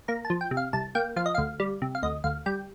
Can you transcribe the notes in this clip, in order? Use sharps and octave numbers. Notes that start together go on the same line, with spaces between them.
A#3 A#5
A5
F3
G5
C3
F5
C2 A5
A#3 G5
F3 F5
D#5
D2 F5
G3
C3
F5
D2 D#5
D2 F5
G3 G5